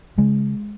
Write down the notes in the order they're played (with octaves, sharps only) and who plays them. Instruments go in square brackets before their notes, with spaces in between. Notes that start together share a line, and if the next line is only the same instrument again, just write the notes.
[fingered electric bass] C#3 G#3